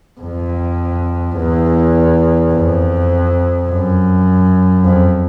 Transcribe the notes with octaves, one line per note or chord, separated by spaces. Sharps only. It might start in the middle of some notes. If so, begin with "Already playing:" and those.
F2
E2
F2
F#2
F2